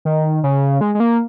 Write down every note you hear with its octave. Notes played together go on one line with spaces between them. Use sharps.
D#3
C#3
G#3
G#3
A#3